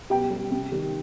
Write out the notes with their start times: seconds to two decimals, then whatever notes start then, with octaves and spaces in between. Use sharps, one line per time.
0.10 B2 G4 G5
0.31 G3
0.51 C3
0.72 D#3 G3